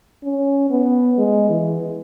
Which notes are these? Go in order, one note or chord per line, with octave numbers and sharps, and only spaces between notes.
C#4
B3
G#3
E3